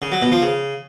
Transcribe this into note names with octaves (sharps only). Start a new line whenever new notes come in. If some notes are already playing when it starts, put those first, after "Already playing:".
C#3
F#3
B2
F3
C#3